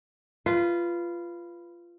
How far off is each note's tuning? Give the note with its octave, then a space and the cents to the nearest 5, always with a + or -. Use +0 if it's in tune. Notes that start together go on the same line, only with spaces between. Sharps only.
F4 -15 B4 +5